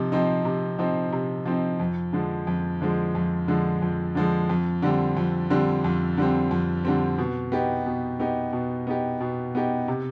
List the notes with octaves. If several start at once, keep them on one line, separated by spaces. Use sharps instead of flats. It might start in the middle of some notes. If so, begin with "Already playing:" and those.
Already playing: C3 F3 C4 D#4
F3 C4 D#4
C3
F3 C4 D#4
C3
F3 C4 D#4
F2
D3 F3 G#3
F2
D3 F3 G#3
F2
D3 F3 G#3
F2
D3 F3 G#3
F2
D3 G3 C4
F2
D3 G3 C4
F2
D3 G3 C4
F2
D3 G3 C4
B2
B3 D#4 G4
B2
B3 D#4 G4
B2
B3 D#4 G4
B2
B3 D#4 G4
C3